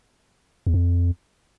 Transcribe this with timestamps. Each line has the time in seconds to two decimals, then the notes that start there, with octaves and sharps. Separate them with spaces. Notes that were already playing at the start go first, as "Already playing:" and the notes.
0.67 E2
0.74 F2